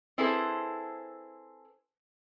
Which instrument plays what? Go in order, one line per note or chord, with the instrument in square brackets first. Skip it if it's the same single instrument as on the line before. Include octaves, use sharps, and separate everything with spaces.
[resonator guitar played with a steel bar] C4 E4 G#4 A4 B4 C5